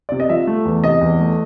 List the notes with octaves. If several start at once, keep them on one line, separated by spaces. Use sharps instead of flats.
C3 D5
D#5
F3 E5
A3
E2
C3 D#5
E2
A3